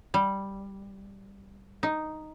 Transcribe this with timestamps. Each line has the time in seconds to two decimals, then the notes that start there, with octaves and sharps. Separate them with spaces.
0.14 G3
1.83 D#4